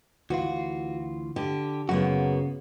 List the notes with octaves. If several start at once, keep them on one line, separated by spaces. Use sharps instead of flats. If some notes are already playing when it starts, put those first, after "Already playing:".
D2 E3 F4 F#4
D3 G4
F#2 C#3 A#3 B3 F#4